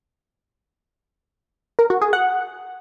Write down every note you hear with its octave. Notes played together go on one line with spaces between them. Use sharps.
A#4
F#4
G#4
F#5